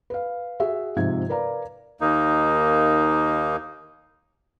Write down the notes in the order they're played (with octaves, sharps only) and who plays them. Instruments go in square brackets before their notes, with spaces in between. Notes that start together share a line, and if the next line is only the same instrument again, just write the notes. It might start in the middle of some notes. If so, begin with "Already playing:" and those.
[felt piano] B4 F5
F#4 G#4 E5
G#2 C3 F3 E5 G#6
A#4 B4 D5 F5 A#5
[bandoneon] D#2 A#3 D#4